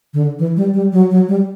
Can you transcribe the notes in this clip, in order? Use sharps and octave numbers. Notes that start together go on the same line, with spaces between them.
D3
E3
G3
G3
F#3
F#3
G3